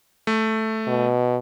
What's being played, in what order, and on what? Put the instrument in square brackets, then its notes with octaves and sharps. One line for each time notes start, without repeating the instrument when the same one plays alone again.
[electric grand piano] A3
[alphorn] B2